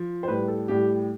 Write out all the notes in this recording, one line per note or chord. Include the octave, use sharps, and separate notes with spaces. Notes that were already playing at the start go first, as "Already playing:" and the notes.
Already playing: F3
C5
A2 G3 B4
A4
A2 G3 G4